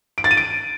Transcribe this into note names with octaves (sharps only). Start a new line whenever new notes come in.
D7
A6
D#7
D7